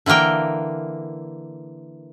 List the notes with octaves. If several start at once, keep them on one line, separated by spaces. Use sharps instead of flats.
D3 E3 A#3 A#4 G5